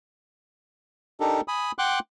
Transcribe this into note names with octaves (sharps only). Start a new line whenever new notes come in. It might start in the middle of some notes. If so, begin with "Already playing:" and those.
D4 D#4 G4 A4 A#4
G#5 B5 D#6
F#5 G5 C6 D6 F#6